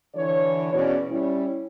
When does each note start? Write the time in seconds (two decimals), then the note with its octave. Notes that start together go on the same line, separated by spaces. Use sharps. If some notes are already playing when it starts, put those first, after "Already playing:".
0.15 D3 E3 C#5
0.73 E2 B2 C#4 C#5 D5
1.09 G3 C#4 E4